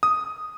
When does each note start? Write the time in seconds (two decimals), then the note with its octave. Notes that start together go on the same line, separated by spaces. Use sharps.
0.03 D#6